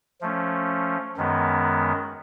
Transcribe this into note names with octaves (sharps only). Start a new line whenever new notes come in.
F3 A3 C#4
F#2 D#3 G#3 B3